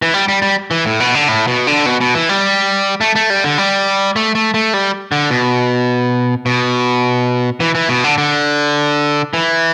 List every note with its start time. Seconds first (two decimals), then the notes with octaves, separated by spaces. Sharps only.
0.02 E3
0.14 G3
0.28 G3
0.42 G3
0.71 E3
0.86 A2
1.00 B2
1.15 D3
1.28 A2
1.47 B2
1.67 D3
1.86 B2
2.01 B2
2.15 E3
2.29 G3
3.01 A3
3.15 A3
3.30 G3
3.44 D3
3.58 G3
4.16 A3
4.35 A3
4.54 A3
4.73 G3
5.12 D3
5.30 B2
6.46 B2
7.60 E3
7.75 E3
7.89 B2
8.04 D3
8.18 D3
9.34 E3